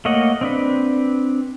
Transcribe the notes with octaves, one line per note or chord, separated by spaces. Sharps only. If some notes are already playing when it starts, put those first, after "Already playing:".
A3 A#3 C#5 D#5 F#5
C4 D4 B4